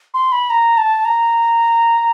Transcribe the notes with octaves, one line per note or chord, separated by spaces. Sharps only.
C6
B5
A#5
A5
A#5